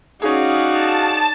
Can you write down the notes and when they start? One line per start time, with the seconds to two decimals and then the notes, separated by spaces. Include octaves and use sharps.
0.22 C#4 D#4 F#4 G#4 D5 F5
0.71 A5